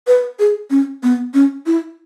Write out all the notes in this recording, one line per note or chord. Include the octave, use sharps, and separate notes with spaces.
B4
G#4
C#4
B3
C#4
E4